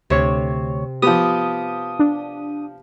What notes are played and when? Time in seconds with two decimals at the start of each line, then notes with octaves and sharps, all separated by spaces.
0.10 D2 C3 C#5
1.02 F3 B3 G4 D#6
1.99 D4